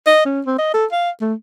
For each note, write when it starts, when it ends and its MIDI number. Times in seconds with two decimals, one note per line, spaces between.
0.06 0.24 75
0.26 0.41 61
0.46 0.58 60
0.59 0.70 75
0.74 0.86 69
0.92 1.10 77
1.21 1.34 57